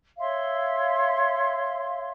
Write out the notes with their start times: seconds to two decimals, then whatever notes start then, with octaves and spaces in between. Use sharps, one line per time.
0.18 C#5 E5 F5 C6